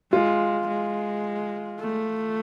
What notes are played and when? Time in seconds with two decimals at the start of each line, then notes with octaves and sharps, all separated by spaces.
0.12 G#3 F4
0.68 G#3
1.80 A3